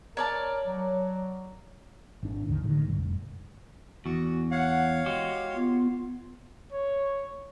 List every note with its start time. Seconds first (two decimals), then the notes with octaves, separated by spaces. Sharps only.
0.17 A#4 C#5 D5 A5
0.67 F#3
2.23 G#1 D4
2.47 G#1 D#2 D3 D#3
2.64 A2 D3 D#3
2.85 B1 G2
2.97 F1
4.06 E2 F#4
4.51 C#5 F5 F#5
5.06 G#3 F#4 G4
5.55 B3 F4
6.73 C#5